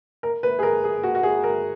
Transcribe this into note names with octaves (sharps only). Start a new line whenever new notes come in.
A#4
B4
G#4
A#4
G#4
F#4
F#4
G#4
A#4